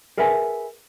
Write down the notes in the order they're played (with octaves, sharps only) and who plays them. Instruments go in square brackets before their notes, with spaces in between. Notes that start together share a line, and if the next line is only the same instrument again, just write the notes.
[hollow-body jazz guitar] G#4 A#4 B4 E5 F#5 G#5